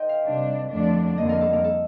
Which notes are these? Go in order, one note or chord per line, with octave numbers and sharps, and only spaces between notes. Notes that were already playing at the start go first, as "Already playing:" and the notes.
Already playing: D#4 A#4 C5 D#5 G5
F5
C3 G3 D4
F2 D3 F3 A3 D4
F2 D3 G3 A#3 D#5
A#4
A4
A#4
A4